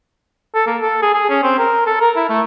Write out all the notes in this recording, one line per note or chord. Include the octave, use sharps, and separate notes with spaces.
A4
A#3
A4
G#4
G#4
C#4
C4
A#4
A4
A#4
E4
A3